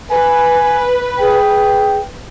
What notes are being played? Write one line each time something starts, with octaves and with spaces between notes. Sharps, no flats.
B4 G#5
G#4 G5